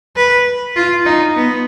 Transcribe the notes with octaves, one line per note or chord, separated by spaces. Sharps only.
B4
F4
D#4
B3